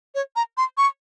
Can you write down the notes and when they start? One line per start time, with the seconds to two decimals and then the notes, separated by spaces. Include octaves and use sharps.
0.15 C#5
0.36 A#5
0.57 C6
0.78 C#6